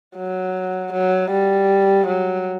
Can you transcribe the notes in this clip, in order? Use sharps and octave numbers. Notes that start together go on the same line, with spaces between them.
F#3
F#3
G3
F#3